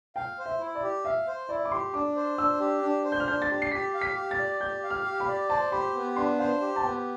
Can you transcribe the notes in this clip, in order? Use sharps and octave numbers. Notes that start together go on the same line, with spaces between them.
F5 G5
C5
E5
E4
D5
G4
E5 F5
C5
E4 D5
D6
G4 C6
D4 D6
C5
D4 E6
G4
D4
C5
G6
F6
D4 G6
A6
G4
C7
G4 B6
F5
B6
G4
A6
D5
G4 G6
F5
F6
G4
B5
D5
C5 A5
G4 B5
B3
D4 C6
C5 F5
G4
A5
B3 G5